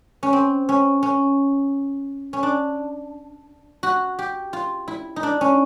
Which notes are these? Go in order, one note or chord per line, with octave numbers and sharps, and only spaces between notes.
C#4
C4
C#4
C#4
C#4
D4
F#4
G4
F4
E4
D#4
D4
C#4